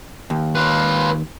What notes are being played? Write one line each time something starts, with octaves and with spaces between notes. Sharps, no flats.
D#2
F4 B4